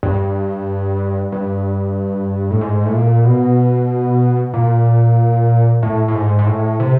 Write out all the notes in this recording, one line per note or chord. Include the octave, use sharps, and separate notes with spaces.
G2
G2
A2
G#2
A2
A#2
B2
A#2
A2
A2
G#2
G#2
A2
C3